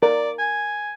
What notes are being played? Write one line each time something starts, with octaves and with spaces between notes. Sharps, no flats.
A#4 D5
G#5